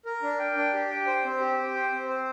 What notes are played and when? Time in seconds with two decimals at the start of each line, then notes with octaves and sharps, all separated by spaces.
0.05 A#4
0.22 D4
0.39 G5
0.56 D4
0.74 G4
0.91 G5
1.07 C5
1.24 C4
1.41 G4
1.58 G5
1.75 C5
1.92 C4
2.09 C5